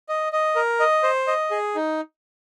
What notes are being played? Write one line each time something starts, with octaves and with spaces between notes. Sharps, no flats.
D#5
D#5
A#4
D#5
C5
D#5
G#4
D#4